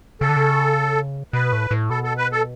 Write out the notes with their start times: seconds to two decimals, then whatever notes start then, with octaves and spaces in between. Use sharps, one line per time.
0.21 C#3 A4
0.29 D3
0.36 C#3
1.33 B2 B4
1.52 A2
1.71 A2
1.90 B2 A4
2.03 A4
2.18 B4
2.32 A4